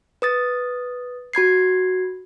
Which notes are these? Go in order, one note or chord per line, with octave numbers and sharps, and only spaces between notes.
B4 D#6 A6
F#4 B5 G#6 C7